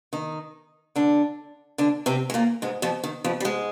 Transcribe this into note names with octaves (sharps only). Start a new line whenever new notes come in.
D#3 D#4
D3 D4
D3 D4
C3 C4
G#3
A#2 A#3
G#2 G#3
F2 F3
D#3
F2 F3
G3
G#2 G#3